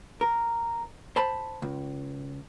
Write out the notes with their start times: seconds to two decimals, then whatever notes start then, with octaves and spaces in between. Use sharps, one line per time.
0.21 A#4
1.16 C5 A5 B5
1.62 C#2